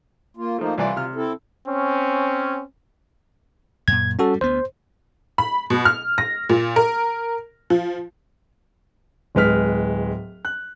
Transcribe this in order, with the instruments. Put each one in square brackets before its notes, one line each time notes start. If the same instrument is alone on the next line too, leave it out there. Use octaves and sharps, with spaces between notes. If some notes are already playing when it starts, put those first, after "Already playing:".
[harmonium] A#3 F4
[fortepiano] F3 A3 [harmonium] A#3 D#4
[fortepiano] C2 E3 D5 [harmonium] F4
[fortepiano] C3 F6
[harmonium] C4 E4 A4
[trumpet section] C4 C#4
[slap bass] F#2 A#2 [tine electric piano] G#6
[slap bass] G3 [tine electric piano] C#4 F#4 A4
[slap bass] D2 B3 [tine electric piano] C5
[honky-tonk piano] B5
B2
F6
A#6
A#2
A#4
F3
[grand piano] D1 G#3 B4 F6 B6
F#6